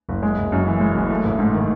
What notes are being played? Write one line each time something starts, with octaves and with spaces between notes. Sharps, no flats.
F#1
G#3
F#1
F#2
E3
G#3
F#1
A3
A1
G#2
D#3